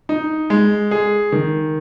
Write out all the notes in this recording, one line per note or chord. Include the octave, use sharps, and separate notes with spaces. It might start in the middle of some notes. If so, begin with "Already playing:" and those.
D#4
G#3
G#4
D#3